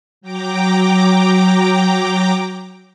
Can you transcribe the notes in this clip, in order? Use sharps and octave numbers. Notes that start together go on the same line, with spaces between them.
F#3 G5 A#5 D6